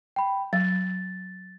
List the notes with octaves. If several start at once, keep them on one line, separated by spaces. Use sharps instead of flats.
G5 B5
F#3 A6